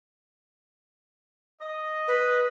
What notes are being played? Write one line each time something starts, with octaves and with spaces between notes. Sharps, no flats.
D#5
B4